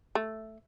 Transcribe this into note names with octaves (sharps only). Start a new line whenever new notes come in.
A3